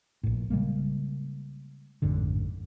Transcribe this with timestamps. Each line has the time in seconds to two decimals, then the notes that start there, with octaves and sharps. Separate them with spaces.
0.23 A#1 A2
0.50 C#3 G3 G#3 A#3
2.02 A1 F2 G#2 D3